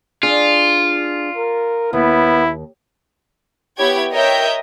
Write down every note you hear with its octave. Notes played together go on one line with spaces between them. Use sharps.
D4 F4 G#4
A#4
D#2 B3 E4
B3 E4 G4 C#5 G5 G#6
A#4 C#5 D#5 E5 G5 G6